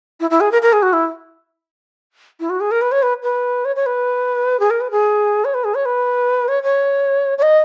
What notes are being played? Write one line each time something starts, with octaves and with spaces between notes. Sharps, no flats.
E4
E4
G#4
A#4
A#4
G#4
F#4
E4
E4
F#4
G#4
A#4
B4
C#5
B4
B4
C#5
C#5
B4
G#4
A#4
B4
G#4
C#5
B4
G#4
C#5
B4
C#5
C#5
C#5
D#5